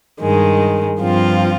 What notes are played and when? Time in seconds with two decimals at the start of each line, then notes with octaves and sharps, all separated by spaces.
0.20 G2 D#3 G#3
1.00 G2 F3 C4 F4